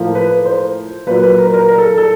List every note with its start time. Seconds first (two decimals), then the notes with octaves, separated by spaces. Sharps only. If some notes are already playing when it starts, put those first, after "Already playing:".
Already playing: A2 F3 A#3
0.15 B4
0.45 C5
1.07 A#2 F#3 A#3 B4
1.23 B4
1.38 A#4
1.46 B4
1.54 A#4
1.69 A#4
1.78 A4
1.98 A4